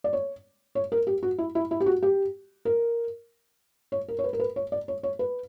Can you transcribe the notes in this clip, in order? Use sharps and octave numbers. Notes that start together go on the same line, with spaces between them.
D5
C#5
C#5
A#4
G4
F#4
E4
E4
E4
G4
F#4
G4
A#4
C#5
A#4
C#5
B4
A#4
B4
C#5
D5
C#5
C#5
B4